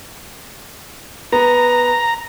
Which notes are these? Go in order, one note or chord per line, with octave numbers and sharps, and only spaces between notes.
B3 A#5